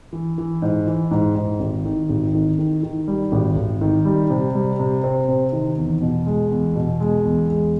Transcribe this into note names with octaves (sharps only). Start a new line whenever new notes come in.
E3
E3
G#2
E3
G#2
G#2
G#1
D#3
G#1
D#3
D#3
D#3
G3
G#1
G#1
D#3
G3
C3
G3
C3
C4
C3
D#3
E2
B2
G#3
E2
B2
G#3
E2
G#3